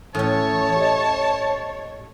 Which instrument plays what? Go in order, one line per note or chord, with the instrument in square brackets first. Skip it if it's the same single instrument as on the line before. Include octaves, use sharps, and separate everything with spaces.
[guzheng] A2 C#4 [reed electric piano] E3 D#6 [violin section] C#5 [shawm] A5
[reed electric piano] G4 D#5